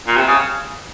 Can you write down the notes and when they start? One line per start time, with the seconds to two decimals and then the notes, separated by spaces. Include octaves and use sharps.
0.07 A#2
0.17 C3
0.28 C#3